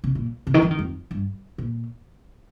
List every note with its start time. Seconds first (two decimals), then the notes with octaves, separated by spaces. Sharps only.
0.04 C3
0.15 A#2
0.47 C3
0.54 D#3
0.62 F3
0.71 D#3
0.79 F2
1.11 G2
1.58 A#2